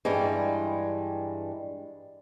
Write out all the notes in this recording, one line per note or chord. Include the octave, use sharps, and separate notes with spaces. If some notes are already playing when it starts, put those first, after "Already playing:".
G2 E3 G3 G#3